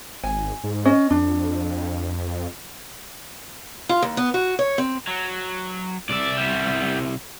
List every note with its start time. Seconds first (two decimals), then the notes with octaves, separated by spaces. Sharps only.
0.23 G#1 G#5
0.64 G#2
0.85 C#4 D#5
1.10 F2 D4
3.89 F4
4.02 D#2
4.17 B3
4.34 F#4
4.59 C#5
4.78 C4
5.07 F#3 F#4
6.09 C2 D5 E5
6.37 G3 B3